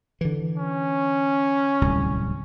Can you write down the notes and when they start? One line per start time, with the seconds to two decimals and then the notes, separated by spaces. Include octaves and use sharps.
0.21 D3 E3
0.58 C#4
1.81 D1 C2